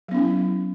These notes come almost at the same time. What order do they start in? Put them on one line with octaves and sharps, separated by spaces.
F#3 B3 C#4 E4